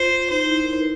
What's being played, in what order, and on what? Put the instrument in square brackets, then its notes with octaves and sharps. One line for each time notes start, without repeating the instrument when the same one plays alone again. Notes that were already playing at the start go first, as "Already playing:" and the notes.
Already playing: [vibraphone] F4 [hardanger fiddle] C5
[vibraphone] D#4 [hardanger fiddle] C5
[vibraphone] E4
A#4
B4